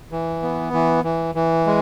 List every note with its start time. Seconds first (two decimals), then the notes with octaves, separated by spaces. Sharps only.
0.12 E3
0.42 B3
0.73 E3
1.04 E3
1.35 E3
1.67 G#3